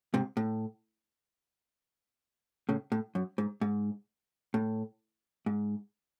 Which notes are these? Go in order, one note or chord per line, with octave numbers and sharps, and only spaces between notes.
G#2 C3
A2
A2 C#3
A2
F#2
G#2
G#2
A2
G#2